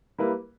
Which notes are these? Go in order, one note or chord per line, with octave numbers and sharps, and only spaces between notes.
G3 A#3 E4 B4